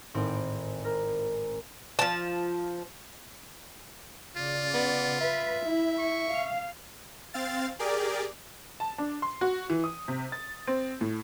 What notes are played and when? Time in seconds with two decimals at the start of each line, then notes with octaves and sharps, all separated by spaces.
0.14 G#1 A2 C4 D7
0.84 A#4
1.99 F3 A5
4.36 C#3 F4 D5
4.74 B3
5.20 B4 E5
5.65 E4
5.99 C#6
6.30 F5
7.34 C4 F5 A6
7.79 G4 G#4 A#4 D5
8.80 A5
8.98 D4
9.22 C6
9.41 F#4
9.70 E3
9.84 D#6
10.08 C3
10.32 A6
10.67 C4
11.01 A2